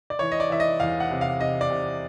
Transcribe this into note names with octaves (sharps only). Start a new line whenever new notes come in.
D5
E3 C#5
D#5
D5
E3 E5
D#5
E2 F5
F#5
C3
F5
C3 D#5
D5
C3